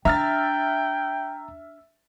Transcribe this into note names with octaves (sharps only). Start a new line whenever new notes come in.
D4 E5 G5 A#5 F6 A6